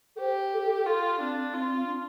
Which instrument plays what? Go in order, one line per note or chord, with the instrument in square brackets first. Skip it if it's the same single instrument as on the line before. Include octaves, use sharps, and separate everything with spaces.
[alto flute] A4
[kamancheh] G4 [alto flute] C5
[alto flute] A4
A4
A4
[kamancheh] F4 [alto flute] A4
[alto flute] C4 [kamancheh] D4
[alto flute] C4 [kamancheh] F4
[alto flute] C4
D4